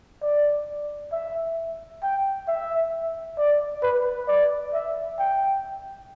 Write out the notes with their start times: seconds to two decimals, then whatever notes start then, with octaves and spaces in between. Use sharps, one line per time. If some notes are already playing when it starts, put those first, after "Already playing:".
0.22 D5
1.12 E5
2.03 G5
2.48 E5
3.38 D5
3.83 B4
4.28 D5
4.74 E5
5.19 G5